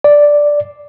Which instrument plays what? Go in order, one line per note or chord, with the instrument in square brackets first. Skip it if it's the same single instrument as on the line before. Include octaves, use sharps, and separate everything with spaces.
[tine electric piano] D5